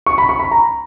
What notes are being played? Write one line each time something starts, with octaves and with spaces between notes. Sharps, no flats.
C#6
B5
C#6
B5
A#5